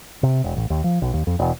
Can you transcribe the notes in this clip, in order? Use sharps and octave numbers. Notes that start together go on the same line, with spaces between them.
C3
E1
A1
D#2
F3
B1
D#2
F2
E1